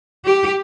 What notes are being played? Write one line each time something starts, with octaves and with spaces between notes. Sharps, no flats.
G4